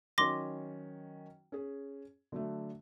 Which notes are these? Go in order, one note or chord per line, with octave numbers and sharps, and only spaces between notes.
D#3 F#3 C#4 C6 D6 A#6
C#4 G#4
D3 F#3 A3